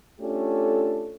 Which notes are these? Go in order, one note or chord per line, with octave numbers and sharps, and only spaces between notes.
A3 C#4 D4 F4 G4 A4